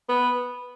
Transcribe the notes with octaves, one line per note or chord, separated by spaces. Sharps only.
B3